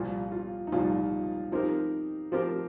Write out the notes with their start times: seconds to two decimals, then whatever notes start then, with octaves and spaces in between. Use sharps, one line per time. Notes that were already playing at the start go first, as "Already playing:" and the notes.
Already playing: C2 A#2 F3 F4
0.32 F4
0.67 D#4
0.72 C2 A#2 F3 F4
1.52 F3 C4 D#4 G4 A#4
2.32 F3 C4 G4 A#4